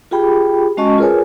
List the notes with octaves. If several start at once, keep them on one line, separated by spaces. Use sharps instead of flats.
F4 G4 G#4 G5 B5
G#3 C#4 F#4 D#5 A5 C#6
F4 G#4 A#4 B4 C#5 G#5